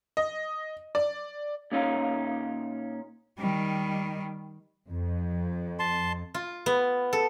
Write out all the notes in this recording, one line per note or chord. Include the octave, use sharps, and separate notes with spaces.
D#5
D5
A#2 C#4 D#4 F4
D#3 G3
F2
A5 C6
F4
B3
A4